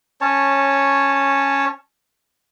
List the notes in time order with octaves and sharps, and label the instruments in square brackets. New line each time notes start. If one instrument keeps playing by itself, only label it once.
[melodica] C#4 C#5 A5